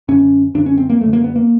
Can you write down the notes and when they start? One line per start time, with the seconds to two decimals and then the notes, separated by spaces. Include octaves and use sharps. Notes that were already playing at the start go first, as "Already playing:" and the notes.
0.08 F#2 D3 C#4
0.54 F#2 D3 D4
0.66 C#4
0.78 C4
0.90 A#3
1.01 F#2 A3
1.05 D3
1.13 A#3
1.24 B3
1.36 A#3